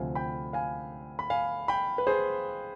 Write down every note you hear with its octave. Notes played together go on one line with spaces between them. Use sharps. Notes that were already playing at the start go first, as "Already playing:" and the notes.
Already playing: D2 C3 F3 F5 G#5
G5 B5
F5 G#5
B5
F5 G#5
G5 B5
B4
G#4 C5